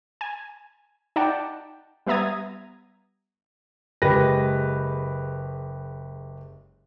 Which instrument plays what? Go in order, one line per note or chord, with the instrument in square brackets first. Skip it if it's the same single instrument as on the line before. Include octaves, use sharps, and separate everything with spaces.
[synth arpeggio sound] G#5
D#4 D5 F#5 G5 A5
G3 B3 E5 A#5 D#6 G#6
[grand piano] F#1 G#3 G4 B4 A#6